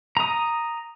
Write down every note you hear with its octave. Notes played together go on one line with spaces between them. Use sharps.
A#5 D#6